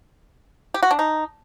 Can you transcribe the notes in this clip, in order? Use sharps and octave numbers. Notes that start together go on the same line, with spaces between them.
G4
F#4
D4
D#4